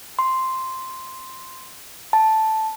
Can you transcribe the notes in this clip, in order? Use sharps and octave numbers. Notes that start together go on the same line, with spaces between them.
C6
A5